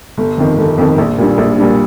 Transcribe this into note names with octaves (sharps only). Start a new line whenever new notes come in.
G1
F2 D#3
G1
F2 D#3
A#1
A#2 G3 D4
A#1
A#2 G3 D4